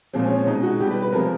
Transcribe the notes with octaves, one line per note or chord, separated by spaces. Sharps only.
A#2 F3 G#3 C4
C#4
C#4
B2 G#3 D#4
F#4
B2 G3 G4
B4
B4
C3 F3 G#3 A#4